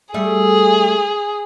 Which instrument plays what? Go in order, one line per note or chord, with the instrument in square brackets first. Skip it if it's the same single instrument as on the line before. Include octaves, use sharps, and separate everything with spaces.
[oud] G3 A3 [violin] G#4